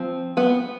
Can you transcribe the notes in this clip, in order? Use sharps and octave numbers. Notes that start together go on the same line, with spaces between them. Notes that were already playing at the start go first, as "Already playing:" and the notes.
Already playing: F3 C4
B3 B4